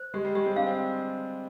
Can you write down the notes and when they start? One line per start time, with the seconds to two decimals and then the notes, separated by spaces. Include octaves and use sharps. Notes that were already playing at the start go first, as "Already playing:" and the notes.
Already playing: C5
0.14 G#3 G4
0.25 G3
0.35 G#3 G4
0.45 C4
0.56 D4 F5
0.66 C4